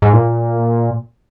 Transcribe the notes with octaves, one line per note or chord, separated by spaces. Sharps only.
G#2
A#2